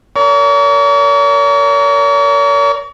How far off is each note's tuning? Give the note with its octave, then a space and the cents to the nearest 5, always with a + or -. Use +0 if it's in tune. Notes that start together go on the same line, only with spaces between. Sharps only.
A#4 -10 C#5 +45